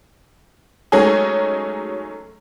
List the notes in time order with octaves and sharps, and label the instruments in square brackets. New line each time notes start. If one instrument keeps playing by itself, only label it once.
[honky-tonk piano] F#3 G#3 A3 C#4 D#4 G#4